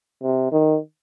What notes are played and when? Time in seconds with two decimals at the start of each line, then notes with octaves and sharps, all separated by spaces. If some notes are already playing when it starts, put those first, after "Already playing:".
0.23 C3
0.52 D#3